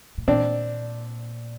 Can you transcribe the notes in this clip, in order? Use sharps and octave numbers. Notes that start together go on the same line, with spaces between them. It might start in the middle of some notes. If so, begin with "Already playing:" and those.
A2
A#2 C4 D4